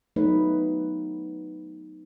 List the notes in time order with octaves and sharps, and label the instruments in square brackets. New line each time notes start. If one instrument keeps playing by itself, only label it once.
[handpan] F#3 A3 B3 D#4 B4